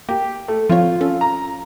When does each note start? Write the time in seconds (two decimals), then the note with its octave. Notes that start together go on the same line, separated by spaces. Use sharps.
0.09 A#3 G4
0.48 A3
0.69 F3 C4 F4 C#5
1.01 C#4 A4
1.21 A#5